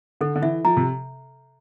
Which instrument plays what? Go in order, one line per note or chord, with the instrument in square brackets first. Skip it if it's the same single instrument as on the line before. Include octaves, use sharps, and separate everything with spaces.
[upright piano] D3 [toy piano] A4
[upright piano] D3
[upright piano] E3 [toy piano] E5
[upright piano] F3 [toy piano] A#5
[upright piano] C3